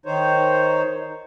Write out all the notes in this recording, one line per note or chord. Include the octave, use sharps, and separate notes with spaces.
D#3 D#4 C5 C#5